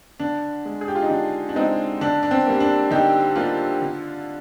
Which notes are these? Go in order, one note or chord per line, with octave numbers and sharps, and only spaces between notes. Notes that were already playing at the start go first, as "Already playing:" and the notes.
D3 D4
G#3
G#4
G4
F4
D#4
D3 D4
D4
G#3 C4 D#4
D3 D4
D4
C4
G3 A#3
D4
D3 D#4 G4
G3 A#3 D4 F4
D3